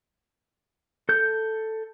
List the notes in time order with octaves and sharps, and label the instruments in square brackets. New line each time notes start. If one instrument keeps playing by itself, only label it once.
[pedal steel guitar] A4 G6